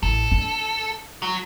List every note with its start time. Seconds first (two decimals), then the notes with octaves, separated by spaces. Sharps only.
0.03 A1 A4
0.32 D4
1.22 F#3